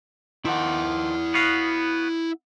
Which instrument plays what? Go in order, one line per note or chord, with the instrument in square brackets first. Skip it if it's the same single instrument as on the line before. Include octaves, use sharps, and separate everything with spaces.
[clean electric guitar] D#3 F3 [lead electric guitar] E4 F#5
[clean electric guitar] B3 F#4 F5